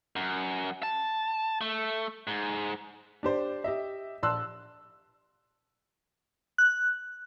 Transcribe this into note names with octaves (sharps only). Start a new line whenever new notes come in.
F#2
A5
A3
G#2
D4 G4 C5 D5
G4 D#5 E5
A#1 A5 C6 E6 F#6
F#6